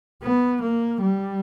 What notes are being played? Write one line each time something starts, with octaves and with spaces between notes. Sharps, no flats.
B3
A#3
G3